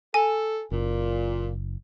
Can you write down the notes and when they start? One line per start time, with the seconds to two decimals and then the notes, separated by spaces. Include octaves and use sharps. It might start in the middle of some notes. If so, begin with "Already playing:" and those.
0.14 A4 G#5
0.71 F#1 A#2